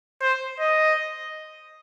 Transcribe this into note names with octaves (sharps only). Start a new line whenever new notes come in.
C5
D#5